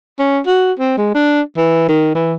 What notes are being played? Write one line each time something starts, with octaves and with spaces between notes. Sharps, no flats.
C#4
F#4
C4
G#3
D4
E3
D#3
E3